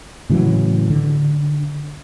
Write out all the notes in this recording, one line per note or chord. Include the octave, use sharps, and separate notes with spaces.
A2 C#3 E3 F#3
D3